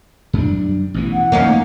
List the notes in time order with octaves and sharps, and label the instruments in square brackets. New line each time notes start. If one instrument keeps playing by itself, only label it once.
[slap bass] F#2 G3 D4
A1 B2 E3
[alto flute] F#5
[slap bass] F2 D#3 E3 [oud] A#3 C#4 D#4